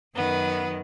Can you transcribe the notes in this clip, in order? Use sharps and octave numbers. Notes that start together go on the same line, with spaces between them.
F#2 D#3 B3